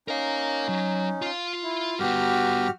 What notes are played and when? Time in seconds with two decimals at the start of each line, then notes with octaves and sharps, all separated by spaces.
0.08 C#4 D#4 A#4 F5
0.69 F#3
1.22 F4 F5
1.63 E4
1.99 G2 B3 F#4 G4 F6